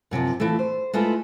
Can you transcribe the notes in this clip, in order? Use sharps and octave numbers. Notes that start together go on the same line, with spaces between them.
F#2 C3 E3 F3
E3 F3 A3
C5
G#3 A3 E4 F4 B4